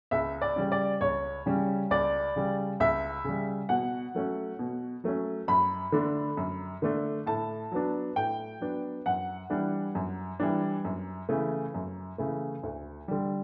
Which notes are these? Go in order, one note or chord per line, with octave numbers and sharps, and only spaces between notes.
C#2 E5
D5
C#3 G3 C#4
D5
C#2 C#5
C#3 G3 C#4
C#2 D5
C#3 G3
C#2 E5
C#3 G3
B2 F#5
F#3 A3 C#4
B2
F#3 A3 C#4
F#2 B5
D3 A3 D4
F#2
D3 A3 D4
A2 A5
F#3 B3 D4
A2 G5
F#3 B3 D4
F#2 F#5
E3 G3 D4
F#2
E3 G3 D4
F#2
C#3 E3 A3
F#2
C#3 E3 A3
D2
D3 G3